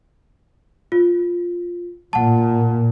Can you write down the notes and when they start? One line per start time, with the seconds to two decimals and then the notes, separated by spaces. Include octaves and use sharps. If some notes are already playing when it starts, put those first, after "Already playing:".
0.92 F4
2.13 A#2 F#5 A5